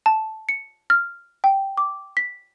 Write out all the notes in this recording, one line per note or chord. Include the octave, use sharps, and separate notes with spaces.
A5
C#7
F6
G5
D6
B6